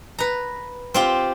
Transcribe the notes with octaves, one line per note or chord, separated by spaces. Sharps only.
B4 A#5
C4 F4 G4